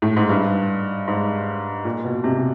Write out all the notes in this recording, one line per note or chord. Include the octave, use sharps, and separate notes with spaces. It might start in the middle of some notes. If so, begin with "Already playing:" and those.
A2
G#2
G2
G#2
A#2
B2
C3